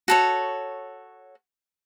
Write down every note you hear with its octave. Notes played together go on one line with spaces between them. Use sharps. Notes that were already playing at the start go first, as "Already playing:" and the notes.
F#4 A4 C#5